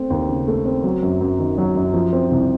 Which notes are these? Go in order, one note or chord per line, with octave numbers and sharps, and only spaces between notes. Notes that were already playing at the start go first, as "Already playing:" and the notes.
Already playing: A3 C4
D#2
C#3
A3
C4
F#3
F#2
F#2
D#3
F#3
F#2
F3
C4
C2